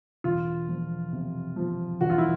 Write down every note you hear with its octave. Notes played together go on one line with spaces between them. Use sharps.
E1 F4
F3
C3
F3
E1 F#4
F4
E4